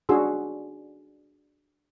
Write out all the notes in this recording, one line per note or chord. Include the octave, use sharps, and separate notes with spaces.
D4 D#4 F#4 G#4 C6 E6